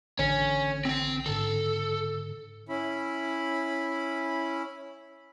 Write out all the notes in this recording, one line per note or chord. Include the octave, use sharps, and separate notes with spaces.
A1 D3 C#4 C#7
C4 G5
G#2 D3 A4
C#4 E4 B5